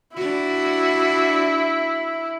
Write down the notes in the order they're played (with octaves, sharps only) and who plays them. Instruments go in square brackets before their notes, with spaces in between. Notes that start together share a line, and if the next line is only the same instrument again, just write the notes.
[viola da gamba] D4 F#4 [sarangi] E4